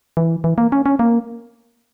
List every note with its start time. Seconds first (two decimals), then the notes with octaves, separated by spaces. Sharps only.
0.17 E3
0.44 E3
0.58 A#3
0.72 C#4
0.86 C#4
0.99 A#3